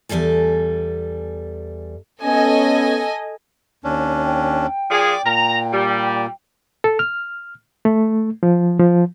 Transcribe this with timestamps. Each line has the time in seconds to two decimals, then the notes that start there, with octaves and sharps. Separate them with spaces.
0.09 E2 G#2 G3 A4 G#5
2.22 B3 C#4 A4 D#5 G#5
3.84 D#2 C#4 D4
4.24 G5
4.91 A#2 F3 G#4 D5 D6
5.25 A#2 A#5
5.73 G3
6.84 A4
6.99 F6
7.85 A3
8.43 F3
8.80 F3